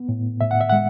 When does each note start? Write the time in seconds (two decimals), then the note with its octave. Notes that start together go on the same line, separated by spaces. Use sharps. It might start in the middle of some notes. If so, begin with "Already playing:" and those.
Already playing: B3
0.09 A2
0.41 A2 E5
0.51 F#5
0.61 E5
0.70 G#3 F#5